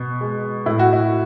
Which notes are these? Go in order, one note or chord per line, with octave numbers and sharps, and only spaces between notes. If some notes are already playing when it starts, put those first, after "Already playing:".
Already playing: B2
G#3
A2 E4
F#4
E4